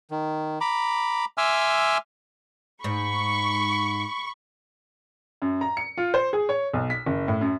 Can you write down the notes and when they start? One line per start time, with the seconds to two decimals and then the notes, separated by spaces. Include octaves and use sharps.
0.11 D#3
0.61 A#5 B5 D6
1.38 E5 G#5 C6 D6 E6 F6
2.84 G#2 B5 C#6
5.42 F#2
5.61 A#5
5.77 C#7
5.98 F4
6.14 C5
6.33 G#4
6.49 C#5
6.73 B1
6.90 B6
7.06 F#1
7.28 A2
7.41 F#2